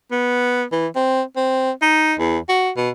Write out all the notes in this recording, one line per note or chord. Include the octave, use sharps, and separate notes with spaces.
B3
E3
C4
C4
D#4
E2
F#4
B2